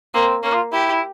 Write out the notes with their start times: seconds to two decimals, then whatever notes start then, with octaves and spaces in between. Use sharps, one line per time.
0.14 A#3 C4
0.43 A#3 C#4
0.53 F4
0.73 E4 G4
0.91 E4